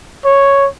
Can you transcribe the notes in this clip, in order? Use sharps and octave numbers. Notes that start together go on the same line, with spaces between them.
C#5